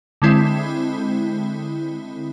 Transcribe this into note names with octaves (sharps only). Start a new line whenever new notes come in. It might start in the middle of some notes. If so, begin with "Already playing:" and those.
D3 G#3 C4 E4